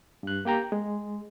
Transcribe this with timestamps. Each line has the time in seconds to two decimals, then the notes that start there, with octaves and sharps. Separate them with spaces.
0.23 G2 F#6
0.45 A#3 G4 G5 A#5
0.72 G#3